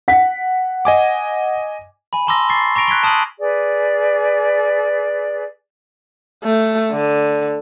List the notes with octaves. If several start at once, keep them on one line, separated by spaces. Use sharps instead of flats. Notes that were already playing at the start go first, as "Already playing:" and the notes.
F#5 B6
D#5 G#5 D6
G#5 B5
A5 A#5 C6 D6 E6 A#6
C#6 A6 C7
A#5 C#6 A#6 D7 F7
F#6 G#6 B6 D7 G7
A5 D#6 F6 D#7 F#7
G#4 B4 D5
A3
D3